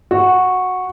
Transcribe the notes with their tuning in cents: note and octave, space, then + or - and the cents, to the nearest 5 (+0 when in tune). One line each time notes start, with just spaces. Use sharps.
F#4 -10